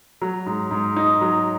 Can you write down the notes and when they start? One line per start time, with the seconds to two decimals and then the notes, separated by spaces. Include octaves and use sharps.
0.22 F#3
0.46 G#2
0.71 G#2
0.96 D#4
1.21 F#3